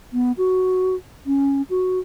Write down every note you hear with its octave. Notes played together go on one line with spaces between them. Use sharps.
B3
F#4
C#4
F#4